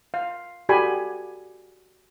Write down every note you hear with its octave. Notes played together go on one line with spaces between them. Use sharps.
F5
F#4 G4 A4 D5 G#5 B5